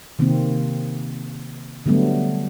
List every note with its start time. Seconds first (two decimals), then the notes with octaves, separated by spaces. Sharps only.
0.19 C3 D#3 A#3 C4
1.86 D3 F#3 G3 A3 B3